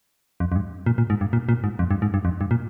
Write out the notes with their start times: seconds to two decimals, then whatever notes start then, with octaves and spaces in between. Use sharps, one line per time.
0.40 F2
0.52 F2
0.56 G2
0.86 A#2
0.98 A#2
1.10 G#2
1.21 G2
1.33 A#2
1.49 A#2
1.64 G#2
1.79 F2
1.91 G2
2.02 G#2
2.14 G2
2.25 F2
2.41 G2
2.51 A#2